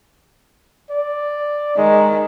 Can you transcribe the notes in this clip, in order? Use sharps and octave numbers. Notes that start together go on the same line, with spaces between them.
D5
D#3 G#3